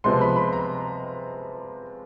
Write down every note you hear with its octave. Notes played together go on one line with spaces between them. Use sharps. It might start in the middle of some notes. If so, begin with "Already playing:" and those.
C3 F3 G#3 B3 C6
B5
B5
A#5